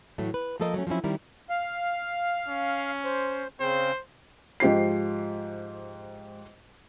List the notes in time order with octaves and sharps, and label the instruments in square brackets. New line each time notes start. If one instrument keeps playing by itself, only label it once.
[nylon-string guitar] A2 E3 F#3 A3
B4
F3 A3 A#3 A4 A#4 D#5
F#3 A3 C#4
F3 F#3 C4 C#4 E4
D#3 G3 C4 E4 A#4
[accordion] F5
[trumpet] C#4
[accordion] C5
[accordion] C#3 C4 [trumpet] C5
[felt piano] G#2 F3 G4 C5 C7